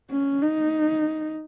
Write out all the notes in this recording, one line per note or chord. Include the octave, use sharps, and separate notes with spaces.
C#4
D#4